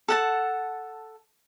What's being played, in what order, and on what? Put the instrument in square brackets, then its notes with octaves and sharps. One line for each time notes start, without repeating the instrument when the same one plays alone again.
[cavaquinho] A4 F#5 A5